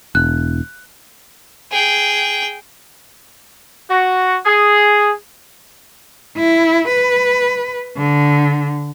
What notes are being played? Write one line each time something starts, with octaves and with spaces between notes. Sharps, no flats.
E1 F#6
G#4 G5
F#4
G#4
E4
B4
D3